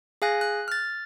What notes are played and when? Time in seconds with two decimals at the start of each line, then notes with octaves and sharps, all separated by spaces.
0.22 G#4 F5 G#5 F#6 A#6
0.41 F#6
0.68 F6 A6